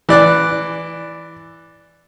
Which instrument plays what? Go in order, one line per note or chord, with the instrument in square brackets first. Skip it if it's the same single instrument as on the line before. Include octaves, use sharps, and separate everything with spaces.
[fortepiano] E3 D5 F#6